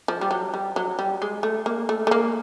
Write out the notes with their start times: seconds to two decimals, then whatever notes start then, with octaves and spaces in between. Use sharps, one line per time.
0.08 F3
0.21 G3
0.31 F#3
0.54 G3
0.76 F#3
0.99 G3
1.22 G#3
1.43 A3
1.66 A#3
1.89 A3
2.07 A3
2.11 A#3